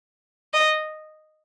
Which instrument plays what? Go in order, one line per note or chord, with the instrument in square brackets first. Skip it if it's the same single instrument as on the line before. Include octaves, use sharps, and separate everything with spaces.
[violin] D#5